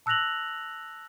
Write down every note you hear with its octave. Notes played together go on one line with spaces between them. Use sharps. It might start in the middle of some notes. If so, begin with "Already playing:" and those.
A5 E6 F#6 A#6 F7 F#7